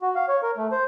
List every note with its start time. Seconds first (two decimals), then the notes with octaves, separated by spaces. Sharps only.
0.02 F#4
0.15 F5
0.28 C#5
0.43 A#4
0.57 A3
0.72 C5